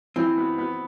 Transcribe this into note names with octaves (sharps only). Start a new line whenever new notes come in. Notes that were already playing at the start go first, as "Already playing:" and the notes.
E3 C4
B3
B3